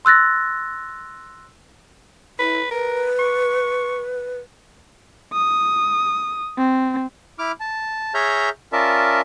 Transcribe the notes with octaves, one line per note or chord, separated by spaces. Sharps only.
C6 E6 F#6 A6 A#6
E4 B4
A#4 B4
C#6
D#6
C4
E4 D6 F6
A5
G#4 C#5 E5 A#5 F6 G6
C#4 F4 A#4 D5 E5 A5